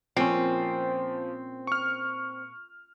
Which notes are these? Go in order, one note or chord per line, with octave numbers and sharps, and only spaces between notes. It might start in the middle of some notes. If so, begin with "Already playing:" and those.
A#2 F3 C4 C#4
C#6 F6